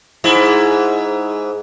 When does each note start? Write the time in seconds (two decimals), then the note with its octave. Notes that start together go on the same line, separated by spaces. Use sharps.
0.24 G#2 E4